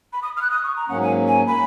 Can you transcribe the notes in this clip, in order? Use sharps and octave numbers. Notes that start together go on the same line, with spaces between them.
B5
D#6
F6
F#6
D#6
C#6
A#5
G#2 F#3 A#3 C#4 F#5
G#5
G#5
B5